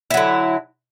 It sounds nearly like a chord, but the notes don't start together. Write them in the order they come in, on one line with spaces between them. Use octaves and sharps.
E4 F#3 D3